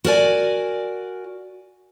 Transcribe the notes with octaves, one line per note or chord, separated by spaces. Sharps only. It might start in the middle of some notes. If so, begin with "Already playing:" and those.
F#4 A#4 D5 G#5